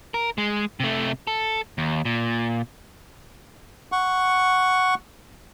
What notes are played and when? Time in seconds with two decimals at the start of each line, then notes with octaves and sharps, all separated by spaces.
0.14 A#4
0.38 G#3
0.80 C3 A3
1.27 A4
1.78 D#2
2.05 A#2
3.92 F#5 C#6